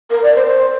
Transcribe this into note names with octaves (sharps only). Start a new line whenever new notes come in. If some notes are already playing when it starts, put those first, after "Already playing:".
A#4
D5
C5
C5